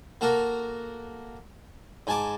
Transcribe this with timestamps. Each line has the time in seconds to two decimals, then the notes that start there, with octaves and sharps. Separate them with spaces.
0.21 A#3 F#4 A4 A#4
2.07 G#2 G#5 A5 D6